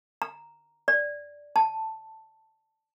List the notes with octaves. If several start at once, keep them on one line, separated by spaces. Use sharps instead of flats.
A#5
D5
A5